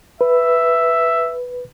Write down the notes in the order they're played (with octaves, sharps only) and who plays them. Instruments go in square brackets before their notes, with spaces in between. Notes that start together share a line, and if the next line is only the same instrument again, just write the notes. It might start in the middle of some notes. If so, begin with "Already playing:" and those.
[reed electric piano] B4 [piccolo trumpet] E5